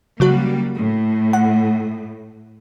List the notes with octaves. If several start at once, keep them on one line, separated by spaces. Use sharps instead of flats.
C#3 F#3 G3 A#3 F#4
A2
F#5